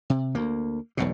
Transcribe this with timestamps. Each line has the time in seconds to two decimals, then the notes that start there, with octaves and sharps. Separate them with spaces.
0.10 C3
0.35 D2 A#3
0.97 E1 B1 F#2 B2